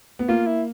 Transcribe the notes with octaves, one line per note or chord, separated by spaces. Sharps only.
B3
A#3 F4
E4